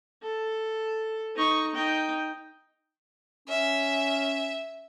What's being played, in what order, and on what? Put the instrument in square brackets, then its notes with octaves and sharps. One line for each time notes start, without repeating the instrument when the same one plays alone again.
[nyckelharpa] A4
D#4 C#6
D#4 G5
[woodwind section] C#4 [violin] E5